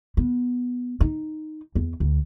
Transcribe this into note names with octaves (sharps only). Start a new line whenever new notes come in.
B3
D#4
E2
D2